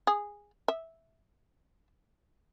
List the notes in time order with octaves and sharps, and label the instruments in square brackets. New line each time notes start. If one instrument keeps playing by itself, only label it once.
[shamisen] G#4
E5